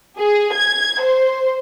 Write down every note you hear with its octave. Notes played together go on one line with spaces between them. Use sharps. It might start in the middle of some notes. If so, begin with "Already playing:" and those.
G#4
G#6
C5